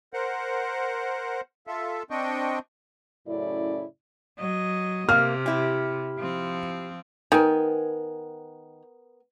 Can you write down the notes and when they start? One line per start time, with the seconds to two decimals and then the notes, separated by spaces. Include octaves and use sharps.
0.14 A#4 C5 F#5
1.67 F4 A4 E5
2.11 C4 D4 D#5 G5 C#6
3.27 F#2 A2 C#3 E4 D5
4.38 F#3 D#5
5.09 C3 A#3 F6
5.46 E4 G4
6.18 F3 C4
7.32 D#3 B3 A#4 G#5